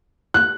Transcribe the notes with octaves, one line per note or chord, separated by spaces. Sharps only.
F#6